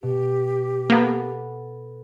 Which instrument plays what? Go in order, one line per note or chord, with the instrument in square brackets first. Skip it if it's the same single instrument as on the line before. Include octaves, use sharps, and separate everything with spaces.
[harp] B2 [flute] G4
[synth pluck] A#3 B3 [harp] A4 B4 F#5